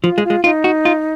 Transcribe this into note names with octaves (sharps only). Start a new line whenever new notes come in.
F3 F4
G#3
F4
G#3
D#4 F4
F#4
F4